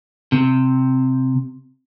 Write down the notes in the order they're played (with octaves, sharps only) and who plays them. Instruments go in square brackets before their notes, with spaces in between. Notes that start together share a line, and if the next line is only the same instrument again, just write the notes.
[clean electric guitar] C3